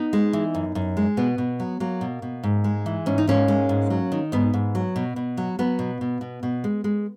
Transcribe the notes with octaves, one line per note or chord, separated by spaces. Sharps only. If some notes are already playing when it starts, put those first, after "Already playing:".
Already playing: B3 D#4
G#3
E3
F#2
F#2
G#3
B2 B3
B2
F#3
F#3 A#3
B2
B2
G#2
G#3
E3
G#2 C#4
D#4
G#2 A#3 C#4
G#3
G#2
F#3
D#3
G#2 B3
G#2
F#3
B2
B2
F#3
F#3 B3
B2
B2
B2
B2
G#3
G#3